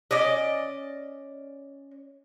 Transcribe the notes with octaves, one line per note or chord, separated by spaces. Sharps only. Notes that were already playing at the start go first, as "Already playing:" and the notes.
C#4 D5 D#5